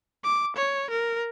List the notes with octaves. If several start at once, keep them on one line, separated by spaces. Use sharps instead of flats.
D6
C#5
A#4